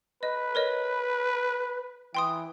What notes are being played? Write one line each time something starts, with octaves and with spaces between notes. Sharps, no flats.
B4 D#5
A#4 C#5 D#5
E3 G5 C6 D#6